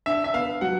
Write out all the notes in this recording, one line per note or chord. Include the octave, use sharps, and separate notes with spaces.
D4 E5
E5
B3 F5
F#3 F#5